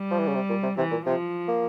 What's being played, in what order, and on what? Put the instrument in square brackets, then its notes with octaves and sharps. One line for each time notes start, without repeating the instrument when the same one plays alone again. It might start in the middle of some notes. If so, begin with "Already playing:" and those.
Already playing: [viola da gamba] G3
[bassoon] F3
E3
C#3
C3
A#2
C3
[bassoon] C3 [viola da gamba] E3
[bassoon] A#2
[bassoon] C3 [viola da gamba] F3
[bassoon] A#3